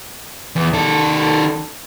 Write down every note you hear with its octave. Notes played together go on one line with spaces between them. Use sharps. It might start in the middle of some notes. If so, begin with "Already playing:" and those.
E2
D#3 A4